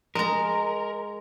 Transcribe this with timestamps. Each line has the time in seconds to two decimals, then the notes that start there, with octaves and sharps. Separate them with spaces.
0.15 G#3 A#4 A#5